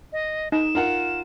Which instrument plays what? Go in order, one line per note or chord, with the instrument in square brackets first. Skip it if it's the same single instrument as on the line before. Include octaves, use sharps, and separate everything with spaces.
[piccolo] D#5
[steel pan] D#4 [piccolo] E7
[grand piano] F4 A#4 F#5